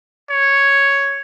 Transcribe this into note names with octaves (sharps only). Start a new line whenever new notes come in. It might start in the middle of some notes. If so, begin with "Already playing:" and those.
C#5